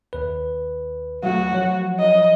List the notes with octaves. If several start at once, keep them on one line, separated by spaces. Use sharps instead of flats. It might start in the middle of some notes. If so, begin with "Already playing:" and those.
D#2 B4
F#3 A3 F#4
F3 F#3 C#5
D#5